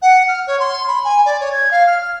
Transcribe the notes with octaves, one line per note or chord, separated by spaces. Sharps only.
F#5
F6
C#5
C6
B5
G#5
D5
C#5
G#6
F5
F6
F6